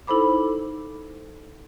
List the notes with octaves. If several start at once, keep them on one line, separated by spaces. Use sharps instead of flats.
D#4 E4 A4 C5 B5 D6